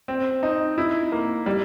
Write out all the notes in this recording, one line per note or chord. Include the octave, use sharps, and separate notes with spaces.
C4
D#4
E4
A#3
G3